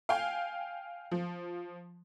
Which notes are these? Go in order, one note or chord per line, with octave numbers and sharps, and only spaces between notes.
F5 G5 G#5
F3